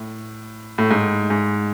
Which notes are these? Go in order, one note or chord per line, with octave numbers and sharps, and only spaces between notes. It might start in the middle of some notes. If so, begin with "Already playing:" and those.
Already playing: A2
A2
G#2
G#2